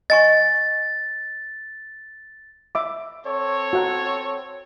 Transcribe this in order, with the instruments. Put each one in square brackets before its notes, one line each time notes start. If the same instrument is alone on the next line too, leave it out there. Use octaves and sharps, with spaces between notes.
[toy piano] D#5 G#5 C#6 [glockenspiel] A6
[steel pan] E5 B5 D6
[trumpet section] C4 A4 C#5
[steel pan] F#4 F#5 A#5